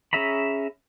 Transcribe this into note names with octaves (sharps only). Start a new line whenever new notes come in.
C#4 G#4 E5 A#5 B5